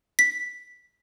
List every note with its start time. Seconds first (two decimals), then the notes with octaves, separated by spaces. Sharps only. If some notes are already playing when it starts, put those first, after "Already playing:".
0.19 B6